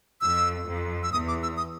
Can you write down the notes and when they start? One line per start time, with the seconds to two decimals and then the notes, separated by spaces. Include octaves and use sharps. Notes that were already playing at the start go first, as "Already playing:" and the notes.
0.21 F2 E6
0.66 F2
1.03 E6
1.13 E2 D#6
1.28 D6
1.43 E6
1.57 D#6